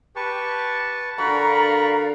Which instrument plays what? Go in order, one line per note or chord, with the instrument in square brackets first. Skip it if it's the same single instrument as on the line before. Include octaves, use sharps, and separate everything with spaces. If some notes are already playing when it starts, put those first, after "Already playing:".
[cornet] G4 [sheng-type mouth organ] B4 A5 C#6
[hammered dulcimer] D3 F#4 [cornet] A#4 [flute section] D5 F5 A#5 [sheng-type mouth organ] B5 C#6